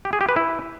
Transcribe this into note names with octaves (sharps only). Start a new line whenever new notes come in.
G4
G#4
G4
B4
E4